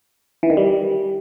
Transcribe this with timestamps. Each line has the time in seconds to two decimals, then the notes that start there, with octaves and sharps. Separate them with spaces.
0.43 E3
0.50 D#3
0.57 G3